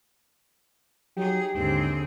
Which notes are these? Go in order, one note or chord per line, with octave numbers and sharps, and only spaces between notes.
F#3 D#4 G4 G#4
D#2 G#2 D3 C4 G#4